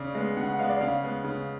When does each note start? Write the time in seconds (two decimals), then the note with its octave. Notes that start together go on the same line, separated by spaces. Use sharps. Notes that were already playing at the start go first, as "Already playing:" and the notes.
Already playing: C#3 D5
0.15 G#3 B3
0.37 C#3 F#5
0.48 F#5
0.59 G#3 B3 F5
0.69 D5
0.81 C#3 F5
1.03 G#3 B3
1.24 C#3